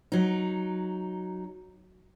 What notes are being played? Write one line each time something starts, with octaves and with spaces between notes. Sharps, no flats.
F#3 D#4